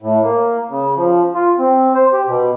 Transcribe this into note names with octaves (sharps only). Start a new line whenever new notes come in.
A2
A#3
C#3
F3
F4
C4
C5
G4
B2